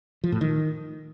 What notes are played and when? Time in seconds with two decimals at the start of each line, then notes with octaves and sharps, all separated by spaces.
0.24 F3
0.32 A2
0.41 D#3